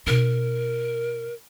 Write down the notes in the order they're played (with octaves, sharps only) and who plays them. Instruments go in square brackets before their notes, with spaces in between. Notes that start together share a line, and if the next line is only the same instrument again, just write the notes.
[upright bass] B2 D#4 [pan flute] A#4